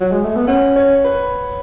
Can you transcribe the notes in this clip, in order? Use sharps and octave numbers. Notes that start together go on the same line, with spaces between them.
F#3
G#3
A3
B3
C#4 F#5
C#5
B4